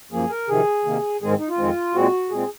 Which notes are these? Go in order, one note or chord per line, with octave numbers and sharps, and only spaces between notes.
F#2 F3 A#3 G#4
A#4
F2 C3 D#3 G#4
C3 D#3 A#3
G#2 D#3 G#3 C4 G#4
D#4
F4
F2 D#3 G#3 C4
A#2 G#3 C4 F#4
A#2 G#3 C4 G#4